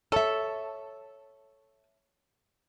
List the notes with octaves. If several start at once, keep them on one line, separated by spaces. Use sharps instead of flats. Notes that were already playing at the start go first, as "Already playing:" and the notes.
A4 C#5 E5